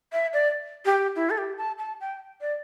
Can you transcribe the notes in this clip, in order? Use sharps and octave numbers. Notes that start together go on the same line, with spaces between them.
E5
D5
G4
E4
A4
G4
A5
A5
G5
D5